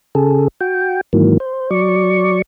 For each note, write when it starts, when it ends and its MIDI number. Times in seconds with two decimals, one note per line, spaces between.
0.15 0.48 49
0.15 0.48 68
0.15 0.48 69
0.61 1.01 66
0.61 1.01 79
1.13 1.38 44
1.13 1.38 51
1.13 1.38 52
1.13 1.38 54
1.13 1.38 58
1.40 1.70 72
1.71 2.42 54
1.71 2.42 74
1.71 2.42 85